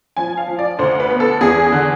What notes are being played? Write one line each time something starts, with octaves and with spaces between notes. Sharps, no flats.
F3 G#5
F5
F3
D5
D2 C5
B4
B3
A4
E2 G#4
D3